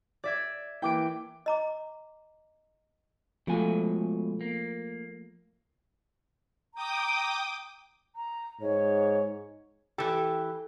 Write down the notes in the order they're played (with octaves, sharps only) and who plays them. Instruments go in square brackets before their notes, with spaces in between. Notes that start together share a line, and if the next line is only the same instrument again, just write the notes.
[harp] D5 E5 G#6
[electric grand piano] E3 A#3 E4 [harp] G5 D6 D7
[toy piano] D#5 A#5 D6
[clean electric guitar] B2 G#3 G#5 [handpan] F3 A3 F4
[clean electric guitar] A#3
[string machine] G5 D6 D#6 [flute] A#5
[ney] A#5
[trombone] G#2 [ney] C#5
[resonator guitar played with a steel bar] E3 G4 [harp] A4 [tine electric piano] G5 E6